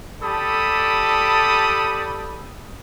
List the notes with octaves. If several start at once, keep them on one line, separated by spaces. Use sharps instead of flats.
G4 A4 D5 A5 B5 D#6